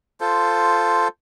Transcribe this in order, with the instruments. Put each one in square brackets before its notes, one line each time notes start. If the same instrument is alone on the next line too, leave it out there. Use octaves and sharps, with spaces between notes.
[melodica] F4 A4 C5